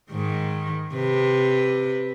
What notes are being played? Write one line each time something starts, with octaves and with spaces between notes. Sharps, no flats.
G#2 D#3
C3 B4